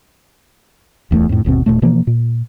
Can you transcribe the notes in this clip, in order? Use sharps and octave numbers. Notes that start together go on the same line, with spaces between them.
D1 E2 G#3 A3
F2 A2
G1 D#2 B2 C4
D#1 D#2 A#2 A3
B2 E3 F3 A#3
A#2